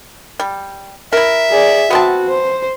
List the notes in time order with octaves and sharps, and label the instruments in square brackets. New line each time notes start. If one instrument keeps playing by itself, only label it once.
[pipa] G3
[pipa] E4 A#4 [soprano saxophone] E5
[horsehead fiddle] G#4 D5
[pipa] B3 C4 A5 [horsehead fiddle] F#4
[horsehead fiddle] C5